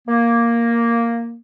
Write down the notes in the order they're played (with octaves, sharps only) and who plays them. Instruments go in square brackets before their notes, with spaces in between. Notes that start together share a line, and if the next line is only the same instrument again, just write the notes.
[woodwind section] A#3